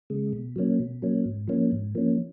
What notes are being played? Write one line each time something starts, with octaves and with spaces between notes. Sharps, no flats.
C#3 G#3
B2
F#3 A#3 C#4
B2
F#3 A#3 C#4
G#2
F3 A#3 C#4
G#2
F3 A#3 C#4